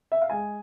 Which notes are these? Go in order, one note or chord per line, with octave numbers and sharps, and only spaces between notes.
E5
F5
G#3 G#5